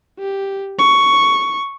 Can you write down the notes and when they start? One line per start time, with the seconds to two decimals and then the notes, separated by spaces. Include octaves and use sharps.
0.19 G4
0.79 C#6